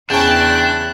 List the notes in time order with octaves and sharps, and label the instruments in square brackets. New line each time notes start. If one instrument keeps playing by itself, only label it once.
[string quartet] E2 E4 F#6 [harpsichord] C#3 C#4 [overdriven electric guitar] D4 [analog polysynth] G5 A5